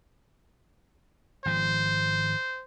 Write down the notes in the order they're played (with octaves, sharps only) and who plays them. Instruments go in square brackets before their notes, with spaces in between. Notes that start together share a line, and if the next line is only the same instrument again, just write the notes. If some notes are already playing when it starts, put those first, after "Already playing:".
[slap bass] G#1 F3 [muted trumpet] C5